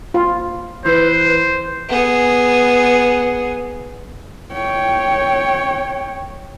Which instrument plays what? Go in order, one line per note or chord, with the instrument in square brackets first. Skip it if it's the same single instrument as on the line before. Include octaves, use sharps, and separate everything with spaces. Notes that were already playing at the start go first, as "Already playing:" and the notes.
[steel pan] F4
[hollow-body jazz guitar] E3 [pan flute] B4 [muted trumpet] C5
[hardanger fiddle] B3 G#4
[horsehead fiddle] C#5 G5